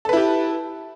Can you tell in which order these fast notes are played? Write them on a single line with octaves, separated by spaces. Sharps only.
A4 B4 E4 G4